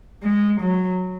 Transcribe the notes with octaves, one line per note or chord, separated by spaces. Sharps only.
G#3
F#3